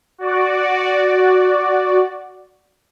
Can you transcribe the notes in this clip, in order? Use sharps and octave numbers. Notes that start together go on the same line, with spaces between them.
F#4 D5